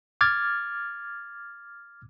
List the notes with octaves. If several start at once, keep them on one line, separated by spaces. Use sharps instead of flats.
D6 F6 G#6 A6